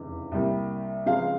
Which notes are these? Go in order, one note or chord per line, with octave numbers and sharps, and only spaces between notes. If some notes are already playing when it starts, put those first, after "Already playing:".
Already playing: F1 E2 C#3
C2 C3 G3 A#3
C#2 C#3 F3 G#3 C4 F5